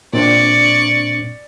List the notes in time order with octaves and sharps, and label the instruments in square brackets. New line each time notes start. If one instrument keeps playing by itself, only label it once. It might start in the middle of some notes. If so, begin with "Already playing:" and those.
[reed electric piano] A#2 C4 D4 [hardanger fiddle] D5 C#6